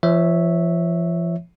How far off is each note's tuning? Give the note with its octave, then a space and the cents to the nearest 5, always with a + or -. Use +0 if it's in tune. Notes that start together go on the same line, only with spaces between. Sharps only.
F3 -35 C#5 +0 E5 -5